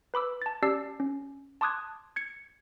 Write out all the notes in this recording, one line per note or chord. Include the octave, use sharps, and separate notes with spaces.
B4 B5 D6 E6
A5 A6
C#4 G4 D5 A5 E6 C7
C#4
A5 C6 D6 D#6 F#6 G#6
G#6 C#7